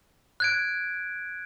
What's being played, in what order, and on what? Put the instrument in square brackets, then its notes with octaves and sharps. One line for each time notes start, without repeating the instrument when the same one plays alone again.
[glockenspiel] F#6 G#6 D7